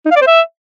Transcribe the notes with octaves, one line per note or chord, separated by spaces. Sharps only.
D#4
F5
D5
C5
E5